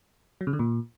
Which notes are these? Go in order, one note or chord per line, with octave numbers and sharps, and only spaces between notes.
F#3
C#3
D3
A#2